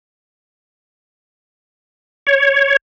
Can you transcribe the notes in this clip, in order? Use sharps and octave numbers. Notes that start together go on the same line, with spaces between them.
C#5